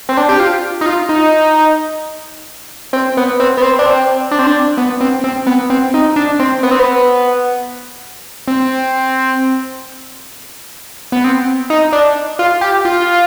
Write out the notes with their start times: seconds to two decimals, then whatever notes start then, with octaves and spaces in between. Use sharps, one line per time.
0.09 C4
0.17 D4
0.29 G4
0.40 F4
0.81 D#4
0.86 F4
1.09 D#4
2.93 C4
3.17 B3
3.40 C4
3.57 B3
3.62 C4
3.79 D4
3.86 C4
4.31 D4
4.39 C4
4.47 D4
4.77 B3
5.01 C4
5.24 C4
5.47 B3
5.70 C4
5.94 D#4
6.16 D4
6.40 C4
6.63 B3
6.71 C4
6.79 B3
8.48 C4
11.12 B3
11.24 C4
11.70 D#4
11.93 D4
12.39 F4
12.61 G4
12.85 F4